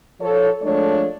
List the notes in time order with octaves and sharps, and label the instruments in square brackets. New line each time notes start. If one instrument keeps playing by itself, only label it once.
[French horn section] F3 A4 C#5
F3 G#3 A3 D4 A4 C#5